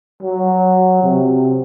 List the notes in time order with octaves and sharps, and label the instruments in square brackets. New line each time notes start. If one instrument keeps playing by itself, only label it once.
[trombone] F#3
C3